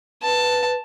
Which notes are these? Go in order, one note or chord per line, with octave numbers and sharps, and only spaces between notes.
B4 A5